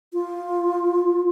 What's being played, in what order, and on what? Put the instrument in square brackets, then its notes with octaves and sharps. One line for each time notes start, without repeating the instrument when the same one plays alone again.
[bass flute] F4